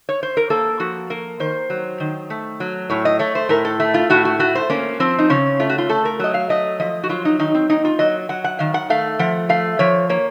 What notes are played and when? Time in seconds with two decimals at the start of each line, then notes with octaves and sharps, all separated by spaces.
0.09 C#5
0.23 C5
0.37 A#4
0.50 A#3 A4
0.80 F3 F#4
1.10 A#3 A#4
1.40 D#3 C5
1.70 F#3
2.00 D#3
2.30 A3
2.60 F#3
2.90 A2 C#5
3.05 D#5
3.19 A3 C#5
3.35 C5
3.49 A2 A#4
3.65 A4
3.80 A3
3.94 F4
4.10 A2 F#4
4.25 F#4
4.39 A3 F#4
4.55 C5
4.70 A#3 C#4
5.00 F3 C4
5.19 D#4
5.30 C#3 C#4
5.60 A3 F4
5.69 F#4
5.78 F4
5.89 A3 A4
6.05 A#4
6.20 F#3 D#5
6.34 F5
6.49 A3 D#5
6.80 F3 D#5
7.03 F#4
7.09 F#3 F4
7.25 D#4
7.39 D#3 D#4
7.54 C4
7.69 A#3 D#4
7.85 F4
7.99 F#3 D#5
8.29 F#3 F#5
8.44 F#5
8.59 D#3 F5
8.74 F#5
8.90 A3 F5
9.19 F3 F#5
9.49 A3 F5
9.79 F3 C#5
10.09 A#3 C#5